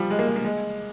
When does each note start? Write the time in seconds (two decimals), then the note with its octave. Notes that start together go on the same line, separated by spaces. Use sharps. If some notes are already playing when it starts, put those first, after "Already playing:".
Already playing: F3 G3
0.10 G#3
0.19 A#3
0.27 G#3
0.36 A#3
0.45 G#3